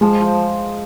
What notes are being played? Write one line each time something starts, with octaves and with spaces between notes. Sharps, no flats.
F3 G#3
F3